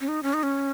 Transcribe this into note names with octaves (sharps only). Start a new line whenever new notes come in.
C#4
D#4
C#4
D#4
C#4